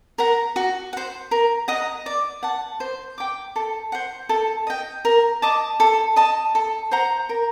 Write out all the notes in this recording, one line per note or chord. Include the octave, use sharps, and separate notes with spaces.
A#4 F#5 A#5
F#4
C5 F#5
A#4
D#5 F#5 A#5
D5
F#5 A5
C5
G5 D6
A4
C5 F#5
A4
D#5 G5
A#4
D#5 A5 D6
A4
D#5 A5
A4
C5 F#5 A#5
A#4